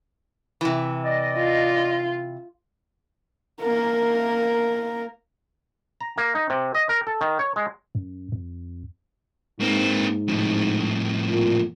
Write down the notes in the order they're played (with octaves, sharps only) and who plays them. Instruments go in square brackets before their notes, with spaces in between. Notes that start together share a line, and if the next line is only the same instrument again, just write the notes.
[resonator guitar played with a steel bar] C3 E3
[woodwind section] D5 D#5
[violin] F4
[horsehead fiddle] A#3 A#4
[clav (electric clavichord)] A#5
A#3
D#4
C3
D#5
A#4
A4
D#3
C#5
G#3
[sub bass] F#2
F2
[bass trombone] G#2 [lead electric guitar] A#3 C4
[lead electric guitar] F2 A2
[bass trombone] A#2